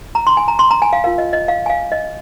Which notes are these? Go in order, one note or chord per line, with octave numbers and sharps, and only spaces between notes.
A#5
C6
G#5
A#5
C6
A#5
G#5
F5
F4 A#4 F5
D#5
D#5
F5
G#5
F5
D#5